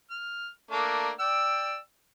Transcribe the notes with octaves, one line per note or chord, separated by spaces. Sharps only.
F6
A3 A#3 D4
D5 G5 E6